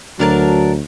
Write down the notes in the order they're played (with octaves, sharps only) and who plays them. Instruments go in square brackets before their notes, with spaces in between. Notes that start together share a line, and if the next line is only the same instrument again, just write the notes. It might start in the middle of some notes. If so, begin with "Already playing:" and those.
[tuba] D2 [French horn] F#3 [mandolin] D4 A#4 A5